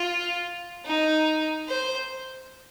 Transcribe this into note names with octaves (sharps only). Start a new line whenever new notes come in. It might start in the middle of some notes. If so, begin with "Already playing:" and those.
Already playing: F4
D#4
C5